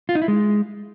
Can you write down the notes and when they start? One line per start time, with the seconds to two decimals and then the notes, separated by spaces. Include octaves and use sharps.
0.09 F4
0.15 D#4
0.22 E4
0.28 G#3